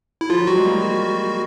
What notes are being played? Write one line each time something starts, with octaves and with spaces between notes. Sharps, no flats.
E4
F3 F4
F#3
G3 F#4
G#3
A#3